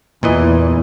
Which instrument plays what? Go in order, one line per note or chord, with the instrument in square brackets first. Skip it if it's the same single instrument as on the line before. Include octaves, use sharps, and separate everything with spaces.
[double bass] E2 [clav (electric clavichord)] A#2 E3 D#5